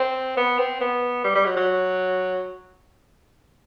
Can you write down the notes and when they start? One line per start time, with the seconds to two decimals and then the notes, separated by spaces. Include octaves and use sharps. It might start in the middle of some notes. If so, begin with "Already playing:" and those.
Already playing: C4
0.37 B3
0.59 C4
0.80 B3
1.24 G3
1.35 G3
1.46 F#3
1.56 F#3